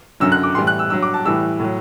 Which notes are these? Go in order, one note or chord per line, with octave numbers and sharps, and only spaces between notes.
F#2 D3 F#3 E6
F#6
D6
A2 E3 G3 C6
F#6
E6
G2 F#3 E6
D6
A5
A2 E3 G3 E6
A2 F#3